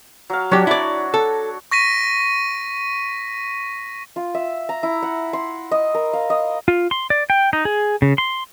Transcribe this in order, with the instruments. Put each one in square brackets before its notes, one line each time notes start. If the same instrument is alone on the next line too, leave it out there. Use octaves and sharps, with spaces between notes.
[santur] F#3 F5
[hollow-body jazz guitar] F#3 G4 [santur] D4 F#4 C#5
[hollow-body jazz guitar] E4 D5
A4
[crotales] C#6 A#6 B6 D#7
[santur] F4
E5
A#5
E4
F#5
C6
D#5
A#4
F5
D#5
[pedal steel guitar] F4
C6
D5
G5
D#4
G#4
C#3
C6